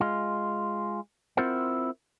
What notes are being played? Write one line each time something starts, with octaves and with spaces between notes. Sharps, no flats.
G#3 F4
C4 E4 F4 A#4 C5 F#5